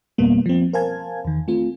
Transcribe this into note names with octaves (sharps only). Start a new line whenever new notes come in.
F2 B2 G3 A#3 B3
F3 C4
A#4 C5 F5 G#5 A5 G#6
E2 D#3
A3 C4 F4